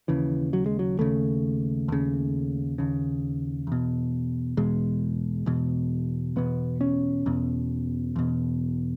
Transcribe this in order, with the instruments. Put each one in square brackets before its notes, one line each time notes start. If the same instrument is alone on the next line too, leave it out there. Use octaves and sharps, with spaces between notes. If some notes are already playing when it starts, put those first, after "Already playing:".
[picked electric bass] D#2 C#3 E3
F#3
G#3
F#3
D#2 C#3 A3
D#2 C#3
D#2 C#3
E2 B2
E2 B2 G#3
E2 B2
E2 B2 B3
C#4
E2 B2
E2 B2